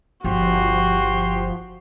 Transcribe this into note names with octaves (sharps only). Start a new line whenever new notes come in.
G1 F3 F#4 G4 C6